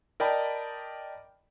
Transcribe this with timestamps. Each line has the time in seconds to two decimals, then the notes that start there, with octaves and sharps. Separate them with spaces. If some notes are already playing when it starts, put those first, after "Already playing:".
0.20 A#4 D5 D#5 G5 A5 B5